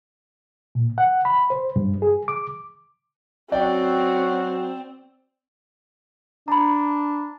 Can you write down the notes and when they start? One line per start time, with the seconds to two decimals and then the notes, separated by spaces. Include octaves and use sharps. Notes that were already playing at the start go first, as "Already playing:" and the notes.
0.75 A#2
0.98 F#5
1.25 B5
1.50 C5
1.76 G2
2.02 G#4
2.28 D6
3.52 F#3 C4 C#4 F#4 D5 G5
6.48 D4 A#5 B5